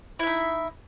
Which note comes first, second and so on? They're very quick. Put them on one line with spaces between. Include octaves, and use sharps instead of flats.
E4 E5 D#4